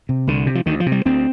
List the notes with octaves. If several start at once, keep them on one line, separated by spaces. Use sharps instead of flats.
C3
C2 D3
C3
F3
D2 D#3
F3
C3
G3
D2 C4